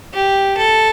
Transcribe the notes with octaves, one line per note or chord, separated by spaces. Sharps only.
G4
A4